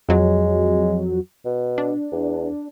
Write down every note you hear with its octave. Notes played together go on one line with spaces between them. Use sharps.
F2 F#3 G#3
B2
D4
E2